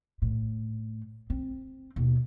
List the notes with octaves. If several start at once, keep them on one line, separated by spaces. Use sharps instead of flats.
A2
C4
D#2 B2